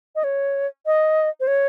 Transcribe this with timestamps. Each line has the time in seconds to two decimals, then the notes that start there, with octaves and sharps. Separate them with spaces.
0.16 D#5
0.24 C#5
0.86 D#5
1.40 C5
1.47 C#5